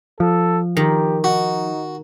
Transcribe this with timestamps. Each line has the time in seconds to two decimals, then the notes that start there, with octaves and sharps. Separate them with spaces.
0.20 F3 A4
0.77 D#3 G4
1.24 D#4 F#4